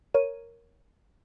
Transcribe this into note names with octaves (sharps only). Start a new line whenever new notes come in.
A#4 C#5 D#7